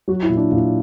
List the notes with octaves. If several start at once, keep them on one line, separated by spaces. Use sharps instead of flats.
F#3 F#4
E4
A#2
D4
A#2